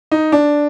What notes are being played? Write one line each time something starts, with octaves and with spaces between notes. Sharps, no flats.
D#4
D4